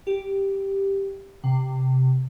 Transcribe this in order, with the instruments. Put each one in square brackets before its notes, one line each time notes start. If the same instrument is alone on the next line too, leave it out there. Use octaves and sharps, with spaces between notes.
[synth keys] G4
C3